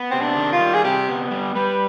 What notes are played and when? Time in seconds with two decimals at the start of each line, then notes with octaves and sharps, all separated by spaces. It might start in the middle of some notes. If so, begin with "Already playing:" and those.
Already playing: B3
0.11 C3 C4
0.21 D4
0.37 D#3
0.52 F4
0.60 G3
0.74 G#4
0.84 C3 G4
1.08 B3
1.31 G3
1.55 G3 B4